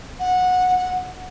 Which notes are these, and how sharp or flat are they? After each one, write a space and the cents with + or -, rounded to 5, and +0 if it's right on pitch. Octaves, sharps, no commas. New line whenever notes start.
F#5 -20